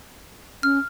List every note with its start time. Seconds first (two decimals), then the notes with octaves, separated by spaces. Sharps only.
0.63 C#4 F6